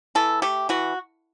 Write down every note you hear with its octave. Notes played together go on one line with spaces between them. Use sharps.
E3 A4
A3 G4
E3 F#4